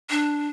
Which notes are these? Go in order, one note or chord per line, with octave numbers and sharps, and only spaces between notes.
D4